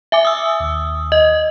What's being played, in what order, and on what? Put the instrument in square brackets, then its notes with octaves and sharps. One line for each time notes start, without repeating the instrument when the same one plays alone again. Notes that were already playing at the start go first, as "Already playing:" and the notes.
[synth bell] E5 G#5 D6
D#6 E6
[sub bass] D#2
[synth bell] D#5